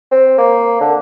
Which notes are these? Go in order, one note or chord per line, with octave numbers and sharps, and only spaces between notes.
C4
A#3
D3